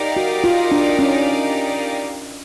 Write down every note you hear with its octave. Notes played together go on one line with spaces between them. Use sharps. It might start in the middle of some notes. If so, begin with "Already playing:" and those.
Already playing: D#4 G4 A#4 D5 F5
F#4
F4
D4
C#4